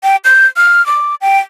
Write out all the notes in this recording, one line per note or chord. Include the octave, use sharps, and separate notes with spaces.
G5
G6
F6
D6
G5